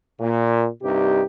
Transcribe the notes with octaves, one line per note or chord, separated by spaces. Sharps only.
A#2
C2 G2 C3 D#4 G4